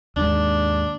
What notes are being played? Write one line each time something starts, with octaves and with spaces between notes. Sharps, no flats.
D#2 G#2 D4